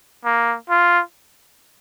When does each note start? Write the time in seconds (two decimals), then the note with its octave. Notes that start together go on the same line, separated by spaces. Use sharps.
0.25 A#3
0.70 F4